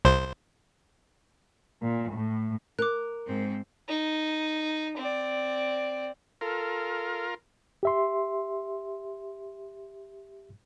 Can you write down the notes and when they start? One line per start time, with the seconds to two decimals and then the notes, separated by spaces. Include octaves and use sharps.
0.05 C2 C5
1.81 A#2
2.12 A2
2.79 A#4 D6 F#6
3.27 G#2 C4
3.89 D#4
4.97 C4 D5
6.41 F4 A4 A#4
7.83 G4 E5 C6